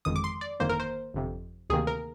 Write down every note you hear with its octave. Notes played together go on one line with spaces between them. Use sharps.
G1 F2 D#3 G#3 D#6
D6
C6
D5
G1 F2 D#3 A#3 C5
A#4
C5
G1 F2 C3
D2 C3 D#3 A#3 G#4
A#4